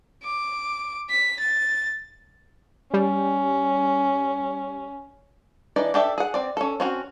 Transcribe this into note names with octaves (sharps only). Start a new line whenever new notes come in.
D6
B6
A6
G3 C#4
E3 D4 D#4 D5
D4 G4 A4 E5
G#4 F#5
C4 D5
C#4 A4
C4 C#4 F#4